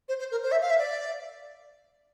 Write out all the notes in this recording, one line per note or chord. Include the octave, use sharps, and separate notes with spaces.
C5
C5
A#4
C5
E5
F5
E5
D5